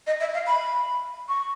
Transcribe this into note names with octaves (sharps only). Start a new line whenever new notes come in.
D#5
E5
F5
B5
C#6